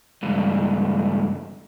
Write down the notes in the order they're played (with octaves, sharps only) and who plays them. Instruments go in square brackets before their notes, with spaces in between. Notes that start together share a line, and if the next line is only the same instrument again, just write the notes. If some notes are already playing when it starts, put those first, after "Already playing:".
[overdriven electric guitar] C#2 G2